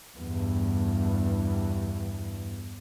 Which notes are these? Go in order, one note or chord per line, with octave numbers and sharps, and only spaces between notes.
E2 G2